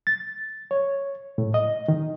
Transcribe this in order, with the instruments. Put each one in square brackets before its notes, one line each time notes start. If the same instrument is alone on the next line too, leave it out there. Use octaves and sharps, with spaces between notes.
[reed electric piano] A6
C#5
A2
D#5
D#3